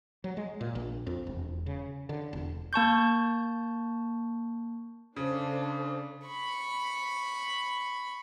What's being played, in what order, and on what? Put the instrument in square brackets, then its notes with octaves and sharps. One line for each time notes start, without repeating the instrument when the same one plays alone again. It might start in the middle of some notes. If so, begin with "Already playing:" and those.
[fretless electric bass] F#3
G#3
A#2
A#1
F2
E1
C#3
D3
E1
[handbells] A#3 A5 C#6 G6
[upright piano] C#3 [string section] D4 A4 C5
[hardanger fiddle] B5 C#6